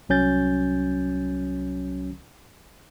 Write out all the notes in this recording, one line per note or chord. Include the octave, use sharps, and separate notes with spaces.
C2 F#3 C#4 G6 A6